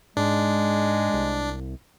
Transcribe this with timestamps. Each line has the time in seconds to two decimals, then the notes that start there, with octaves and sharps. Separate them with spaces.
0.17 G#2 G#3 D4
1.14 C2